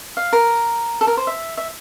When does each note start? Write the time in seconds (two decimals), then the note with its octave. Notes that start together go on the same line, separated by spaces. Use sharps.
0.17 F5
0.33 A#4
1.01 A4
1.07 A#4
1.17 C5
1.27 E5
1.57 E5